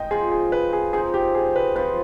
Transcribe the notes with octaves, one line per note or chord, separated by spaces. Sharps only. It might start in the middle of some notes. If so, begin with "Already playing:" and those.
Already playing: G#3 D#4 D#5 G5
F3 C4 F4 G#4
G#4
B4
G#4
F3 C4 D#4 G#4
G4
G#4
B4
F3 C4 F4 B4